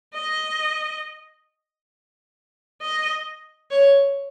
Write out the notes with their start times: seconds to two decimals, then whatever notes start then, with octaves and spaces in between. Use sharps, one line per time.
0.14 D#5
2.82 D#5
3.71 C#5